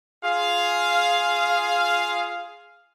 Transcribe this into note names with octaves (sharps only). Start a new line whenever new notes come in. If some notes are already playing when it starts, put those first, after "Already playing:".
F4 G#4 F5